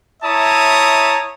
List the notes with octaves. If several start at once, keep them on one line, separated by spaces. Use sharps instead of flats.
E4 C#5 E5 A5 A#5 D#6